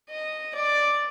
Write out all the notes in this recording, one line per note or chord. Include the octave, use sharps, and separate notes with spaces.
D#5
D5